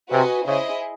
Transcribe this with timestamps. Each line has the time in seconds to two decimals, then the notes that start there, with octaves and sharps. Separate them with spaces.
0.10 C3 F#4 B4 D#5 G#5
0.45 C#3 E4 G#4 C5 D#5